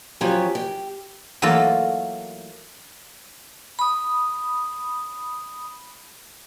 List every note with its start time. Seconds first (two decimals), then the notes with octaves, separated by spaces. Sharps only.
0.21 F3 F#3 B3 C#4 G4
0.55 G4
1.42 E3 F#3 A3 A#3 F4 A4
3.79 B5 D#6